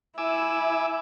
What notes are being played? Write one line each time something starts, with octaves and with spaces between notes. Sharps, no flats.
E4 G#5 D6 E6